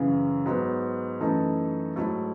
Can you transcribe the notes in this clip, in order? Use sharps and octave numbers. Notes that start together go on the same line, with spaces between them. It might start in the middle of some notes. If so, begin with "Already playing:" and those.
Already playing: F#2 C#3 E3
G#2 F#3 B3
F#2 E3 A3 D#4 A4
G#2 F#3 A3 E4 A4